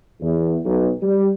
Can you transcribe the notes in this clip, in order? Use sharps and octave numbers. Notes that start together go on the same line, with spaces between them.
E2
B1
G3